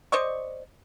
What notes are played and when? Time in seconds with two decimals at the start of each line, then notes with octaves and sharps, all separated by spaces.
0.12 C5 D5 D#5 C#6